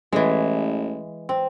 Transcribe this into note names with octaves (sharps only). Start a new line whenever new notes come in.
A1 E3 G#3
C4